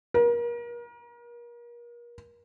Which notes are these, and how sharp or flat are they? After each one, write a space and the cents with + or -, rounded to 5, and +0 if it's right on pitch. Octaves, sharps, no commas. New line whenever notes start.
A#4 +35